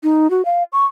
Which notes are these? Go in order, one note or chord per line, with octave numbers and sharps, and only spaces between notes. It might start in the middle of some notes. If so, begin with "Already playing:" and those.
D#4
F#4
F5
C#6